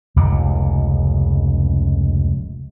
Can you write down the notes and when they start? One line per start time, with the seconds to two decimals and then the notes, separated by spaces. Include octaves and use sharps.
0.16 F1 C#2 A#2 C#3